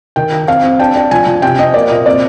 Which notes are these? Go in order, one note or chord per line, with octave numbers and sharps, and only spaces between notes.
D#3 G5
D#4
C4 F5
C4
D4 G5
D4
F3 G#5
F3
C3 G5
C3 D#5
A#3 D5
A#2 D#5
C4 D5